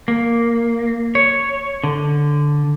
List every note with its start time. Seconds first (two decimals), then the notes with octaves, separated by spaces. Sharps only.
0.08 A#3
1.15 C#5
1.84 D3